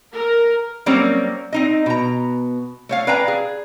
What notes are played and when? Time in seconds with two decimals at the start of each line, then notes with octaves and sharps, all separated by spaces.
0.13 A#4
0.86 F#3 G3 A#3 C4 C#4 A#4
1.53 C4 D#4 D#5
1.86 B2 A#5
2.89 A3 C#5 F5
3.07 B4 D5 F5 G5 G#5 A#5
3.28 G#4